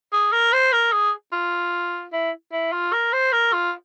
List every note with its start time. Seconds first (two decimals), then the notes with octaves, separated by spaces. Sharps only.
0.13 G#4
0.33 A#4
0.53 C5
0.73 A#4
0.93 G#4
1.33 F4
2.13 E4
2.52 E4
2.73 F4
2.93 A#4
3.13 C5
3.32 A#4
3.53 F4